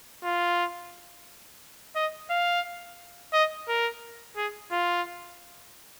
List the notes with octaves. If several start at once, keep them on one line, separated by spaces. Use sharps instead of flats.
F4
D#5
F5
D#5
A#4
G#4
F4